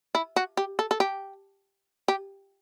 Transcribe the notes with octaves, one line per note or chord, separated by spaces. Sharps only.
E4
F#4
G4
A4
A4
G4
G4